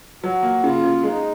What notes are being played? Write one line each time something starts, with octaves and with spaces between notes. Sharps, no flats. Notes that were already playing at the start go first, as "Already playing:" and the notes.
F#3 F#4
A#3
C#3 F4
C#3
G#3 D#4